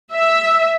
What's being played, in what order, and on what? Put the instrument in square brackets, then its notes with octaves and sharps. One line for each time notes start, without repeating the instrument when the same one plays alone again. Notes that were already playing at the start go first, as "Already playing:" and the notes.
[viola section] E5